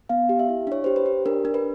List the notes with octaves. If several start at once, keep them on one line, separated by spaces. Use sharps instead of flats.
B3 F5
G4
E5
E4
D4 C#5
G4 C5
B4
G4
D4 A#4
D4
B4